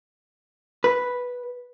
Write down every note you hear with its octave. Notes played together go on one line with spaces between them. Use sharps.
B4